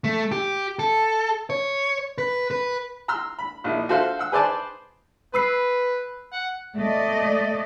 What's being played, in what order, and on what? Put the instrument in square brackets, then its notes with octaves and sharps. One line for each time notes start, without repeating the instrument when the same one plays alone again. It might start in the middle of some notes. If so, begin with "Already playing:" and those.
[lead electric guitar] A3
G4
A4
C#5
B4
B4
[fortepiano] A#5 C6 E6 F6
B5
A#1 D#4 E4
F4 F#4 A4 C5 E5 F5
F#5 E6
G#4 B4 C5 D5 G#5 A5
[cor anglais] B4 [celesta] B5 E6 C7
[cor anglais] F#5
[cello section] A3 D5 D#5